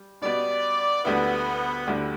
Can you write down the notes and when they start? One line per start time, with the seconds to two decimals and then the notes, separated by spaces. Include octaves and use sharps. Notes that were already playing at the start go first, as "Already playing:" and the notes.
Already playing: G3
0.22 B2 G3 B3 D5
1.04 D2 D3 G3 B3 E4
1.87 D2 D3 G3 E4